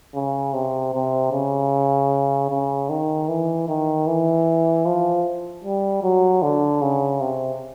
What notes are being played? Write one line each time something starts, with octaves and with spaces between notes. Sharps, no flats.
C#3
C3
C3
C#3
C#3
D#3
E3
D#3
E3
F3
G3
F#3
D3
C#3
C3